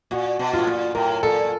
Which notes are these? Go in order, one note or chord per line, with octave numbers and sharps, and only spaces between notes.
A#2 F#4
B2
A2 F4
A#2
A2 A#4
A#2 A4